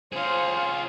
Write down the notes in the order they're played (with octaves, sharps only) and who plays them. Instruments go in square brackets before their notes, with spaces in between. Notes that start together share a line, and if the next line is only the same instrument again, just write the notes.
[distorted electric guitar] F4 G#4 [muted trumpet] C5 [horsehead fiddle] C#5 F5